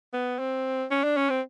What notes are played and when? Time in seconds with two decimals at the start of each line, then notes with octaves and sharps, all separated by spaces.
0.13 B3
0.39 C4
0.91 C#4
1.04 D4
1.17 C#4
1.30 C4